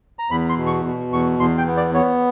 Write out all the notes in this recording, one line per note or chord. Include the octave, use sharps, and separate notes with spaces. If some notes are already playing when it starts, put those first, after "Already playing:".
A#5
E2 B5
C6
B2
C#6
B2
E2 C#6
E2 C6
G5
B3
D5
B3 C#5